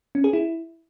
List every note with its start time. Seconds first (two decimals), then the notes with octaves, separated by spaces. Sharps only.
0.15 C#4
0.24 G#4
0.33 E4